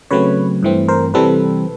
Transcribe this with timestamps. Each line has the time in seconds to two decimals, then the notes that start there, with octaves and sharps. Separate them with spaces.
0.11 C#3 F#3 A3 C4 B4 C#5
0.63 G2 E3 A3 C4
0.88 A#4 C5
1.14 C3 E3 G3 C4 A4 B4